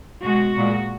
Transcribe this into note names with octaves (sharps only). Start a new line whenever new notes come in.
B2 G#3 F#4
A#2 G#3